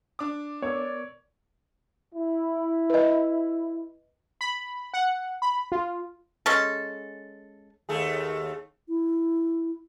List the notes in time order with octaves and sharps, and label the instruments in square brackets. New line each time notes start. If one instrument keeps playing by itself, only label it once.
[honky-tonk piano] D4 D6
[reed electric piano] B3 A#4 E6 [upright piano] C#5 [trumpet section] D5
[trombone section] E4
[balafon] B4 D#5
[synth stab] B5
F#5
B5
F4
[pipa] G#3 C#4 A4
[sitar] D#2 A3 G#4
[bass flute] E4